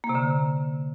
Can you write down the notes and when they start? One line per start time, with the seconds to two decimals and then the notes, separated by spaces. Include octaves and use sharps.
0.04 A#3
0.09 C3
0.15 D3